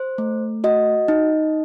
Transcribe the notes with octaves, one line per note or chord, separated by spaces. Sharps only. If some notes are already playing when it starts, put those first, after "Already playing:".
Already playing: C5
A3
F#4 D#5
D#4